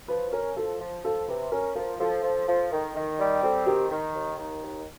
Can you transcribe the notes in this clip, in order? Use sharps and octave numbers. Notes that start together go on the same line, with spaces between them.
F3 B4
C#4 A#4
F3 A4
F3
F3 A4
C3 B4
C#4 A#4
F3 A#4
F3 A4
F3
F3
D#3
D#3
G3
C4 A4
D#3 G4
D#3
D#2
D#3
D#2